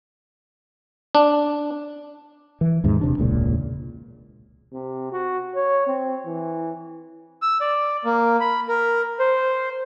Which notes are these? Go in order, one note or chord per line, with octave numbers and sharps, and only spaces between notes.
D4
E3
D#2 G#2 C3
E1 C3 D4
E1 C#2 A#2
C3
F#4
C#5
C4
E3
E6
D5
A#3
B5
A#4
C5